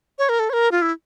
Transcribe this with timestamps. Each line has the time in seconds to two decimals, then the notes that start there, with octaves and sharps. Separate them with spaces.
0.19 C#5
0.29 A#4
0.39 A4
0.50 C#5
0.53 A#4
0.72 F4
0.82 E4